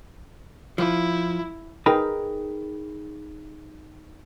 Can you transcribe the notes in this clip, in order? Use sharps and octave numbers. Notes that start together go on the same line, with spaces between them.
F3 E4
D#4 G#4 A#4 B4 G5 B5